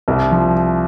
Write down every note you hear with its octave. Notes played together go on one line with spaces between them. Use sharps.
C2
F3